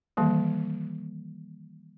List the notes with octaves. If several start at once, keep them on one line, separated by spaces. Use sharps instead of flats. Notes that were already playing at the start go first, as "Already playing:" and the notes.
D#3 E3 G3 A#3